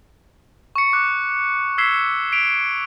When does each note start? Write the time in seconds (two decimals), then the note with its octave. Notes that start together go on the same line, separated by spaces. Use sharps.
0.76 C#6 C#7
0.93 D6 F#6 C#7
1.78 E6 G#6 B6 C7 E7 G7
2.32 B6 D7 F7